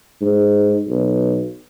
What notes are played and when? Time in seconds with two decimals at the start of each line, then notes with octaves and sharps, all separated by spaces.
0.21 G#2
0.89 B1